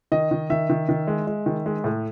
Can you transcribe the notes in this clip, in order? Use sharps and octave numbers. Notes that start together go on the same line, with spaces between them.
D#3 D#5
D#3
D#3 E5
D#3
D#3
G#3
G#3
D#3
G#3
A2